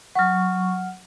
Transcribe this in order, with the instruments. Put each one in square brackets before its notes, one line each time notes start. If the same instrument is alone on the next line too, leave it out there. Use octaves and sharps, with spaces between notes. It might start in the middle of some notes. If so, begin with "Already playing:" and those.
[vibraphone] F#3 C#6 [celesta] F#5 F6